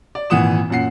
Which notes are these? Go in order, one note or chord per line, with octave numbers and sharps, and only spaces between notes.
D5
G#1 A#2 E3 F#5 D#6 E7
F#2 A#2 F#5 C7